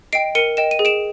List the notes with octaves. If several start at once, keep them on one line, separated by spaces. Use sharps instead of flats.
D#5 G5 C7 D7
A#4 C#7 D#7
D#5 G5 E7
D#7
G#4
D7 E7